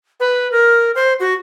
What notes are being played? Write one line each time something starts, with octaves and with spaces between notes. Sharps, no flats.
B4
A#4
C5
F#4